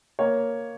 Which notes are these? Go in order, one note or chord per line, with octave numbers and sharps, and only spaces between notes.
A#3 C#5